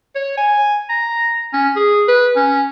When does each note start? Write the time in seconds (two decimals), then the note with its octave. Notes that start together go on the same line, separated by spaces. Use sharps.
0.15 C#5
0.37 G#5
0.89 A#5
1.53 C#4
1.76 G#4
2.08 B4
2.36 C#4